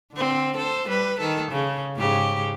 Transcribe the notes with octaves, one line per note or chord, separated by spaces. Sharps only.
D3 C4
A4 C5
G3 B4
D#3 A4
C#3
G#2 C#3 G4